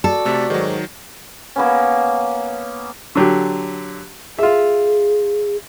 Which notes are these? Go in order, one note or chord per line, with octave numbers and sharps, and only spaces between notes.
F#4 A4 D5
C3 A3
G#2 D#3 F#3
A#3 B3 C#4
D3 F#3 G4
F4 G#4 E5